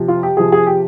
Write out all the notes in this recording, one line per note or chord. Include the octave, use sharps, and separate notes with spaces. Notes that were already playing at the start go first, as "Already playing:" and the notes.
Already playing: C3 F3
F4
G4
C3 F3 G#4
G#4
G4